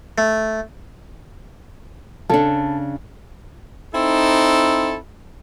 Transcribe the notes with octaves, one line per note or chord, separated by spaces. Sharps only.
A3
C#3 D4 A4
C4 D#4 E4 A4